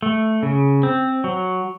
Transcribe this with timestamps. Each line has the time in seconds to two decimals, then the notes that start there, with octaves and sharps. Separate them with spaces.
0.02 A3
0.43 C#3
0.83 C4
1.24 F#3